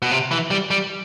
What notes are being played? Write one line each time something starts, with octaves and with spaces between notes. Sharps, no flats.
B2
C3
E3
G3
G3